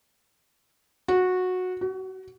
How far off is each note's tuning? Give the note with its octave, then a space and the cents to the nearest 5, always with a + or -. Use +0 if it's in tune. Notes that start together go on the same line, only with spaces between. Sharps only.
F#4 -15
F#4 +30